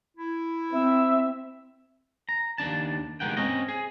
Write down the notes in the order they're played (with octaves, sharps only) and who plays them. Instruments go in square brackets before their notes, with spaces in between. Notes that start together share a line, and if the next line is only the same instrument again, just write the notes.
[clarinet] E4
[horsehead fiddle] C4 [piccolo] E5
[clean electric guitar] A#5
D#2 F3 D4 A5
D#2 A#2 G#3 A#4 F#5 G5
C4 C#4 D#5
G#4